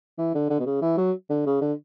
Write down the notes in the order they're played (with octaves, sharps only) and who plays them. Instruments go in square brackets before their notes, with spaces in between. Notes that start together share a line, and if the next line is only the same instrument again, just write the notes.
[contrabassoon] E3
D3
D3
B2
C#3
E3
F#3
D3
C#3
D3